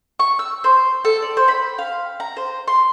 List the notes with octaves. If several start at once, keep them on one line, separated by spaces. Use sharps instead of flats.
C#6
E6
C5
A4
D5
C5
B5
F5
A#5
C5
C6